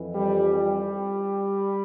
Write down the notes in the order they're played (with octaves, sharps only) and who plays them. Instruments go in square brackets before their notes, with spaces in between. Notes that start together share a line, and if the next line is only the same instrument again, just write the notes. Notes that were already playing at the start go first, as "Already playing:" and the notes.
Already playing: [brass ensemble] F2 E3
G3
G3